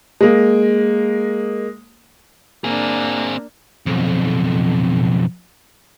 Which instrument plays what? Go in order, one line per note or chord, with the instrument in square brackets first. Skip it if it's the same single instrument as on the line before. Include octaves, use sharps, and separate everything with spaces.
[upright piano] G#3 A#3
[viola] A#3 D4 [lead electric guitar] C4 G#4
[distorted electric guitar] B1 F2